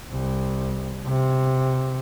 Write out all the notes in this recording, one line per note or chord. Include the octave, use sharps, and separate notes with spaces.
C2
C3